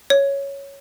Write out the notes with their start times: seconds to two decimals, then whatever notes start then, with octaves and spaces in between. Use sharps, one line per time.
0.10 C#5